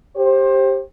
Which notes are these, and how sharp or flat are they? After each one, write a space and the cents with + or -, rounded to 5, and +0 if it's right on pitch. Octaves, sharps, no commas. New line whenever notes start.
G4 +0 C5 +25